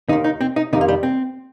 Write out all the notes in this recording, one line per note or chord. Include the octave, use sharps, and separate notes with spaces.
D#2 D#3 D#4
D#4
C4
D#4
F2 C3 D#3 D#4
A#3
G3
C4